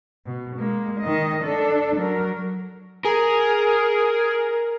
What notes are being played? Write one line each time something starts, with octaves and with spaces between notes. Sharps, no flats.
B2
G#3 A#3
D#3 D#5
D4 A4
F#3 A#4
G#4 A#4